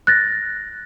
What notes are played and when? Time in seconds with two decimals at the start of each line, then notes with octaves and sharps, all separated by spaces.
0.07 F#6 A6 A#6